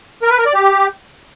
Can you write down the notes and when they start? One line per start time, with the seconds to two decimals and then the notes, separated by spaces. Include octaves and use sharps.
0.22 A#4
0.30 B4
0.38 A#4
0.46 D5
0.54 G4